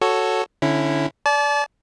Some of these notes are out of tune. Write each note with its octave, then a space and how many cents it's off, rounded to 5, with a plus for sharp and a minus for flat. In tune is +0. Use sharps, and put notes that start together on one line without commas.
F#4 +0 A4 +0 C#5 +0
D3 +0 C#4 -15 E4 +5
D5 -20 A5 -35